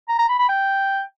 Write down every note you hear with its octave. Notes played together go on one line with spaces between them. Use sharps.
A#5
A#5
B5
B5
G5